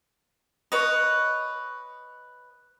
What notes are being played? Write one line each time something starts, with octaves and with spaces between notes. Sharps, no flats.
B4 C#5 D#5